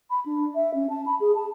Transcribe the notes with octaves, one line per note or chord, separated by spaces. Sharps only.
B5
D4
E5
C#4
A5
B5
G#4
A5